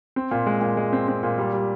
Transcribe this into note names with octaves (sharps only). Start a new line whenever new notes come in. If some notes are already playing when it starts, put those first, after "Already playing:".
C4
A#2
G#3
A#2
G#3
C4
C4
A#2
G3
G3